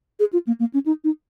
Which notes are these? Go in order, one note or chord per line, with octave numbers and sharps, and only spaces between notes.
G#4
F4
A#3
A#3
C#4
D#4
D#4